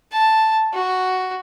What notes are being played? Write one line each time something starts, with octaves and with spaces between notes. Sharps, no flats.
A5
F#4